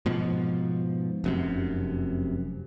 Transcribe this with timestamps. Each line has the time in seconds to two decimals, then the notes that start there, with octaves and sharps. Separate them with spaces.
0.06 G#2 B2 F3
1.24 F1 F#2 C3